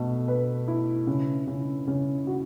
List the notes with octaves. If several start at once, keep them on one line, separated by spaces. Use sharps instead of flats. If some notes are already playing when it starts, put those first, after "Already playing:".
Already playing: B2 A3
B4
E4
C#3
C#3
C#3
F#4